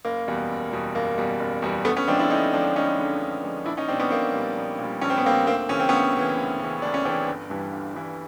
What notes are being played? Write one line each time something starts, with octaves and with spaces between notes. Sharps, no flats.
F#1 A#3
E2 B2 G3
F#1
E2 B2 G3
F#1 A#3
E2 B2 G3
F#1
E2 B2 G3
D2 A3 B3
B3 C#4
D3 F3 G#3 C4 D4
D4 E4
D2 C#4 D#4
D3 F3 G#3 C4 D4
D2 C#4 D#4
D3 F3 G#3
D2
D3 F3 G#3
A#1 D4 E4
C#4 D#4
A#2 G3 C4 D4
B3 C#4
A#1 A#3 C4
A#2 G3
A#1
A#2
G3
A#1 C#4
C4
B3
A#2 G3 A#3 C4
D2 A#3 C4
C#3 E3 C#4
C4
D2 B3 C#4
C#3 E3
D2
C#3 E3
D2 D4
C#4
C#3 E3 C4 D4
G1
G2 E3 G3
G1
G2 E3 G3